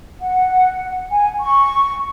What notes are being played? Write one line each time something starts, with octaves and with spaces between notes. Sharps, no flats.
F#5
G#5
C#6